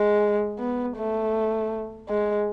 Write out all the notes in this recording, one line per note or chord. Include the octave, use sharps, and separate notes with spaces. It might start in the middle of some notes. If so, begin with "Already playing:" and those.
Already playing: G#3
B3
A3
G#3